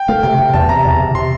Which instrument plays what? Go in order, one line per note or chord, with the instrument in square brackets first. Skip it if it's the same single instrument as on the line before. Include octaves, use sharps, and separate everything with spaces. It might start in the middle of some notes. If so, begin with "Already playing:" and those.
Already playing: [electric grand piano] G5
[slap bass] A3 [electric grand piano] F5
[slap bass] C3 [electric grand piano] G5
[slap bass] C3
[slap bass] E2 [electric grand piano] A5
[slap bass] C3 [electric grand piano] A#5
[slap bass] E2
C3
[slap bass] C3 [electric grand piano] C6